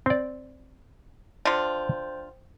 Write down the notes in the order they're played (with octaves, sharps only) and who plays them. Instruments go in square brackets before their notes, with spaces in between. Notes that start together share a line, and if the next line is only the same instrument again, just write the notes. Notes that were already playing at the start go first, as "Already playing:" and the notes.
[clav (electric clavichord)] C4 D5
[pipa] D3 F4 [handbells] C5 G5